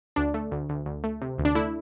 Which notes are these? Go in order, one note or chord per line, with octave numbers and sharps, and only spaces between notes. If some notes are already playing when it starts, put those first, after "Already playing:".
D2 D4
A3
D2
D2
D2
A3
C3
D2
D4
A3 E4